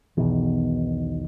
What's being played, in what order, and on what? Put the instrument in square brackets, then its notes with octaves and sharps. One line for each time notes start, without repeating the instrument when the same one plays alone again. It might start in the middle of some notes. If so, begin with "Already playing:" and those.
[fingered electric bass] B1 B2 D#3 [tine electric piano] E2